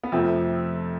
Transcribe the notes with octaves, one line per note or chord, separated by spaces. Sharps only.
B3
F2 C3 F3 A3 C4